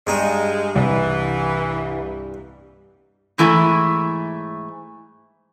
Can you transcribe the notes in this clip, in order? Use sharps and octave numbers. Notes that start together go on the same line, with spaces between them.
G2 G#3 D#4
C2 E3
G#2 E3 A3 E4